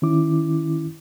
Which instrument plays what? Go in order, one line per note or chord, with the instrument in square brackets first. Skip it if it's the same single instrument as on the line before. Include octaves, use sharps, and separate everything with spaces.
[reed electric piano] D#3 C#4 E4 D6